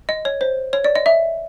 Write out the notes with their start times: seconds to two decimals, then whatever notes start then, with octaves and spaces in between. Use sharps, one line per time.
0.09 D#5
0.25 C#5
0.41 C5
0.73 C#5
0.84 D5
0.96 D#5
1.06 E5